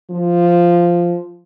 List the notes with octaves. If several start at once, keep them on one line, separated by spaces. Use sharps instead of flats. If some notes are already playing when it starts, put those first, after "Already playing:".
F3